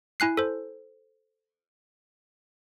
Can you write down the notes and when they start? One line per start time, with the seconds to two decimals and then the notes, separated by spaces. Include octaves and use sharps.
0.20 E4 G#5 F#6 C7
0.37 A4 C5